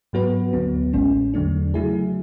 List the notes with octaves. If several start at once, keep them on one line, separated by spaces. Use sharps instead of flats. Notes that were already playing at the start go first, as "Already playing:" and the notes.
G#2 F#3 B3 F#4 B4
D2 D3 F#3 B3
A1 A2 G#3 C#4
E2 D3 F#3 A3 D4
C#3 F#3 A3 E4 G#4